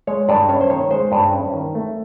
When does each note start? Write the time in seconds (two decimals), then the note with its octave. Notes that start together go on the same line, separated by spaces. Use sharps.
0.07 G#3 C#5
0.29 G2 D5
0.49 C#4 C#5
0.61 C5
0.69 D#3 C#5
0.91 G#3 C5
1.12 G2
1.33 C#4
1.54 D#3
1.75 A3